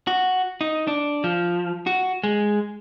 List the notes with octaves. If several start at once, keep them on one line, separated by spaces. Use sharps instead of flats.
F#4
D#4
D4
F3
F#4
G#3